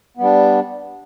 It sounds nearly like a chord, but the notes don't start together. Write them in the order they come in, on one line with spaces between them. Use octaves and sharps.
B3 G3 D4